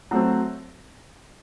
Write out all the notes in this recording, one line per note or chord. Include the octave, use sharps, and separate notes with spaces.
F#3 A3 C4